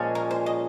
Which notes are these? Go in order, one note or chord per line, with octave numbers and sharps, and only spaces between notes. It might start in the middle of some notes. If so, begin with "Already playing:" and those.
Already playing: A#2 F3 G#3 C#4
A#4
C5
D#5